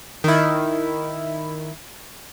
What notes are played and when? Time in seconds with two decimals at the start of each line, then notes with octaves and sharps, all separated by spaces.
0.24 D#3 E4